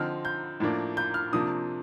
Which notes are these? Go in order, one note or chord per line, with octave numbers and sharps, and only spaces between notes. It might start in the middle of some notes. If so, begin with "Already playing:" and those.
Already playing: D3 F3 C4 D#4 F6
G6
A2 F3 A#3 D4
G6
F6
C3 F3 A#3 D4 D#6